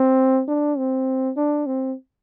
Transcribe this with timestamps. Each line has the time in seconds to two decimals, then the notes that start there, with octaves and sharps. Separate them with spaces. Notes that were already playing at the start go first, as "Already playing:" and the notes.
Already playing: C4
0.48 D4
0.78 C4
1.37 D4
1.67 C4